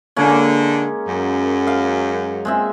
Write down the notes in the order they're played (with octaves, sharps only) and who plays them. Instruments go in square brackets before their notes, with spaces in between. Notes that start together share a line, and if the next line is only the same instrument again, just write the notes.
[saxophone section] D3 [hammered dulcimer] G#3 A#3 C#4
[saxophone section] F#2
[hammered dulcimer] F5
G#3 C4 E5